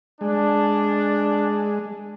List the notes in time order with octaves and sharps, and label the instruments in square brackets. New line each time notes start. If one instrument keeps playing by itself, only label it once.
[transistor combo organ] G#3 [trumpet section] D4